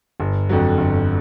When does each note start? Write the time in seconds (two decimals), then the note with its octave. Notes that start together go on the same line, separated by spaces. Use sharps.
0.20 G1
0.49 F2 D3 F#3
0.77 G1